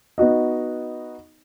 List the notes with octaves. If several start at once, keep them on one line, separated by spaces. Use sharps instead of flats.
B3 D#4 F#4 D#5